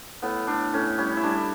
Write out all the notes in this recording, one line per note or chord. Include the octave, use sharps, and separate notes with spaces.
A2 B3
A2 D4
A2 C#4
G3 C#4
E4
G3 D4